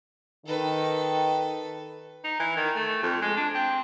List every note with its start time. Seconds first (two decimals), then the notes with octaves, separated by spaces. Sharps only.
0.46 D#3 A4 B4
2.24 D#4
2.40 E3
2.57 D#3
2.76 A3
3.03 F2
3.22 G#3
3.37 D4
3.55 C4